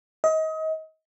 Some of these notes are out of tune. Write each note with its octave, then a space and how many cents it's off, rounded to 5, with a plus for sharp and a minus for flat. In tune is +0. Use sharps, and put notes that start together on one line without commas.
D#5 +30